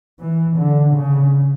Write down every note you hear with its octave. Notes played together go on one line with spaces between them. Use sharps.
E3
D3
C#3